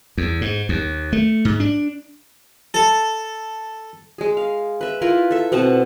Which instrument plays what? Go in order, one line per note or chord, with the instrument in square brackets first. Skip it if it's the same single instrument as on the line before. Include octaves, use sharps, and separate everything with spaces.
[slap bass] E2
G#2
D#2
A3
G#2
D4
[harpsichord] A4
[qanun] G#3 G#4
F5
B4 E5
E4 F4 A#4 B4
A4 E5
B2 C4 F#5 A5